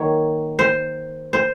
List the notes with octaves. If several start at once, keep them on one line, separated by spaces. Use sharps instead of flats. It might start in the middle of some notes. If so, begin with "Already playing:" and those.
Already playing: D#3 F#3 A#3 C#5
C5
C5